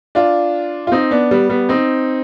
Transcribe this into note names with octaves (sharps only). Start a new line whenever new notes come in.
D4 F4
F4
C4 D#4
B3 D4
G3 B3
G3 B3
C4 D#4